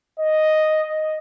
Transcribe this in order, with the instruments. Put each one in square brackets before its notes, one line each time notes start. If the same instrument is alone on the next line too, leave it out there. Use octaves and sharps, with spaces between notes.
[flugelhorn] D#5